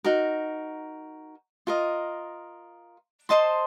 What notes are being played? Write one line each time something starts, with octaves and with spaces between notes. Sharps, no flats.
D#4 F#4 A#4
F4 A#4 D#5
C5 D#5 A5 C6